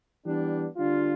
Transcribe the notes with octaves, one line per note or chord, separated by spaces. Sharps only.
E3 G3 B3 D4
D3 G3 D4 F4